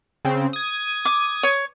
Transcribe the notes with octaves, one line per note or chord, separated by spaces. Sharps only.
C#3 C4
D#6 G#6
D6
C#5